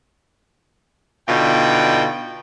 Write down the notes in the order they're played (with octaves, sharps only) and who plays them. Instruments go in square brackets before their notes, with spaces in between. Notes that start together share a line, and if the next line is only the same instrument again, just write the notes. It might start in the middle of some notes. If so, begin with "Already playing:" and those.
[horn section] B2 D3 D#4 F4 D5 G5